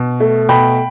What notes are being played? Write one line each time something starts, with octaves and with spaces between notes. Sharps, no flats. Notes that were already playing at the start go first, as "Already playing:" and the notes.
Already playing: B2
A3
B2 G5 B5